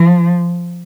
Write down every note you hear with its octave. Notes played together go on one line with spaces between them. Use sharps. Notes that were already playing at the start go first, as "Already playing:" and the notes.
Already playing: F3